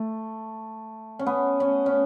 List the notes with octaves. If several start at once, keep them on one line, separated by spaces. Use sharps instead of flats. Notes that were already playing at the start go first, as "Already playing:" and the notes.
Already playing: A3
C#4
B3
C#4
C#4